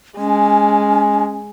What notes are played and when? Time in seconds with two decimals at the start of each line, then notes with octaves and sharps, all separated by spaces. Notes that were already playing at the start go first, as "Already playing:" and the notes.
0.18 G#3 C#4